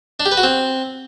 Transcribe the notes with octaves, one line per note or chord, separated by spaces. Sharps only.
D4
G4
B4
F#4
C4